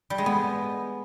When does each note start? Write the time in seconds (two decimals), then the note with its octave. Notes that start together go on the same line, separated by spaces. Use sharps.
0.10 G3
0.18 G#3
0.26 B3